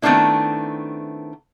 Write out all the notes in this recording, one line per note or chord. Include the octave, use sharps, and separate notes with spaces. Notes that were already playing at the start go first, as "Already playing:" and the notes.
D#3 A3 B3 C4 D4 E4